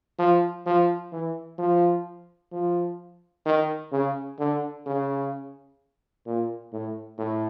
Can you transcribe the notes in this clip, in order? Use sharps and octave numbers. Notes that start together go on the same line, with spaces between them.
F3
F3
E3
F3
F3
D#3
C#3
D3
C#3
A#2
A2
A2